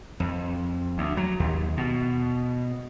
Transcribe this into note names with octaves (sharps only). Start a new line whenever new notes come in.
F2
D2
F#3
D#2
B2